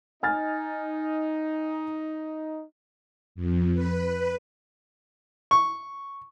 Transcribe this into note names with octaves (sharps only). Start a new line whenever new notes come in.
D#4 G#5 F6 A6
F2
B4
C#6